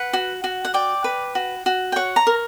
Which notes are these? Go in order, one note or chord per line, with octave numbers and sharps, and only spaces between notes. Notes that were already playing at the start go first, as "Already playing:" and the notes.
Already playing: B4 F#5
F#4
F#4
F#5
D5 G5
B4
F#4
F#4
G5
C#5 F#5
A#5
A#4